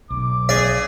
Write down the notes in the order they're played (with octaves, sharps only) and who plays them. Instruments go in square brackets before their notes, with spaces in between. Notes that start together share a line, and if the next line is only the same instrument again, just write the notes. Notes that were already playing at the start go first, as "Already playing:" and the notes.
[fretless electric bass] B1 [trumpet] D6
[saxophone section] C#3 G#4 [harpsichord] D5